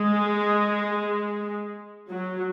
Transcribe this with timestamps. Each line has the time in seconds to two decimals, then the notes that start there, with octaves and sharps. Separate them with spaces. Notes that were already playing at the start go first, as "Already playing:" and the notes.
Already playing: G#3
2.09 F#3